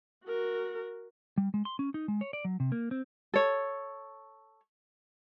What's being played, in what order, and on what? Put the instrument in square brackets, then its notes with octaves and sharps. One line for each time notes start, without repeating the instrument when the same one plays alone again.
[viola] F#4 A#4
[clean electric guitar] G3
G#3
C6
C#4
D#4
G#3
C#5
D5
F#3
C3
A#3
C4
[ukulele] A4 C#5